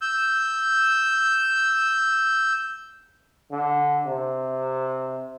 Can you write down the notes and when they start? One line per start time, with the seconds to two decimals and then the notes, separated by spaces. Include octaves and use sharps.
0.02 E6 G6
3.52 D3
4.06 C3